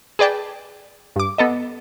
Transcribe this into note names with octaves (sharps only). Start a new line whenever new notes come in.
G#4 B4 D5 G5 A5
G2 D6
B3 A4 D#5